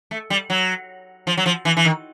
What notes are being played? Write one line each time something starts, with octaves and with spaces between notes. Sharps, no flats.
A3
G3
F#3
F3
F#3
F3
E3
E3
D#3